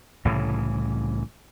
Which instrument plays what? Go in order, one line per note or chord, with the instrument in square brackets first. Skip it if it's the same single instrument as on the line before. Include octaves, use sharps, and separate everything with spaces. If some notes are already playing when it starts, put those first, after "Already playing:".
[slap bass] C2 A2 C#3 E3